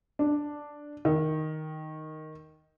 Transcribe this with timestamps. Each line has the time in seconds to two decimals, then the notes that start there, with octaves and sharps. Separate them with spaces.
0.19 D4
1.05 D#3